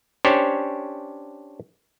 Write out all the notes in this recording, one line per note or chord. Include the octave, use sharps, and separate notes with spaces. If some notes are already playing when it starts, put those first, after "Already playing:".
C#4 D4 G4 C5 C#5